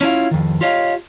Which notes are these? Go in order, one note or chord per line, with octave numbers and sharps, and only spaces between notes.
C#4 D4 E4 F4
F2 D#3
F4 G4 C#5 D#5 F5